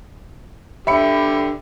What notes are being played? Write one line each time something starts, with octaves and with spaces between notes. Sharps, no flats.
D3 G4 E5 B5 C#7